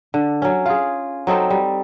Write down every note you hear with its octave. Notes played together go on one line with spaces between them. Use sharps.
D3
F#3 C#4
F4 G#4
F#3 C4 D#4 A4
G3